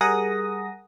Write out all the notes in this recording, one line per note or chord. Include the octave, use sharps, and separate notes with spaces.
G3 G#4 A#4 F#5 D#6 A#6